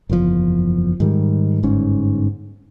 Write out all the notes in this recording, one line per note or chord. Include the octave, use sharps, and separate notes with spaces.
F#1 E2 C3 F3
G#2 D#3 G3
G1 G#2 C#4